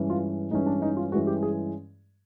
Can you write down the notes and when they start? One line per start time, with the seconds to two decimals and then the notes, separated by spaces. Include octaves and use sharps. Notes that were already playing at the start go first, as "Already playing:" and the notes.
Already playing: G2 E3 G#3 C#4
0.10 F4
0.51 G2 E3 G#3 C#4 D#4
0.66 D4
0.82 D#4
0.97 F4
1.12 G2 E3 G#3 C#4 F#4
1.27 G4
1.43 G#4